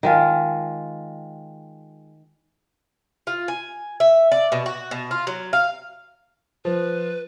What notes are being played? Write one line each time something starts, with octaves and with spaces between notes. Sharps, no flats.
D#3 G#3 F4
F4
G#5
E5
D5
B2
F#4
B2
F4
F#3
F5
F3 B4